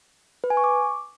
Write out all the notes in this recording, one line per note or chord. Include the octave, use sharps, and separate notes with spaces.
B4
G#5
C#6
D6